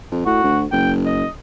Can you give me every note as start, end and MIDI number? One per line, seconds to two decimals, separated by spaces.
0.11 0.21 41
0.26 0.39 45
0.26 0.60 66
0.44 0.65 38
0.72 1.24 30
0.72 0.92 79
1.06 1.29 75